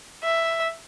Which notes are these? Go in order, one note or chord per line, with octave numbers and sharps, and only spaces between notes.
E5